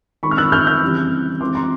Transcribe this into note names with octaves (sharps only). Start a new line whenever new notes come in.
D#3 G#3 C4 B5 C#6
F6
E6 F#6
F6 G6
F6 G6
C#3 E3 G3 C4
E3 G#3 C4 C6 D6
A#5 C6